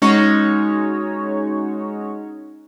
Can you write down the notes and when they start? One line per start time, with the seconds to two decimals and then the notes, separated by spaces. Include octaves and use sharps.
0.02 G#3 C#4 D#4 F#4 C#5